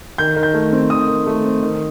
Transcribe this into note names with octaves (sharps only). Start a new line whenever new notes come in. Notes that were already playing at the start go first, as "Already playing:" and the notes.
D#3 G6
D#3
G6
A3
C4
D#3 D#6
D#3
A3
C4
D#3